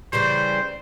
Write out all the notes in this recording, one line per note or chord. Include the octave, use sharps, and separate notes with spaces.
C#3 E3 G3 C5